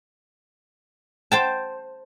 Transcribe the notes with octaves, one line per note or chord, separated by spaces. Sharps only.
C5 G5 A5